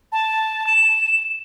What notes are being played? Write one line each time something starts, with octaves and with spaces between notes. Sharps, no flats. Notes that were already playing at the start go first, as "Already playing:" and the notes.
A5
E7